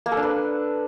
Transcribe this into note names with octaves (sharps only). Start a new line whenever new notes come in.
A#3
A4
D4
B4